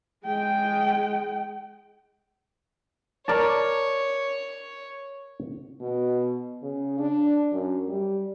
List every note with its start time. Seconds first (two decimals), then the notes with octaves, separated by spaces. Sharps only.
0.25 G#3 G5
3.28 A#4 C#5 D5 A5
5.81 B2
6.62 C#3
6.99 D4
7.52 F#2
7.88 G3